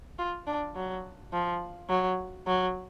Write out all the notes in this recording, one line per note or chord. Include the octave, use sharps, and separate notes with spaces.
F4
D4
F#3
F3
F#3
F#3